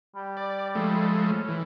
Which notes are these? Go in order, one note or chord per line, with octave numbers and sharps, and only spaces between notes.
G3
D5
F3 G#3 A3
C#4
E3